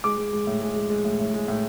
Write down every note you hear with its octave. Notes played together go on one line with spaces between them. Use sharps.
G#3 D6
G#3
G#3
A2
G#3
G#3
G#3
A2
A2
G#3
A2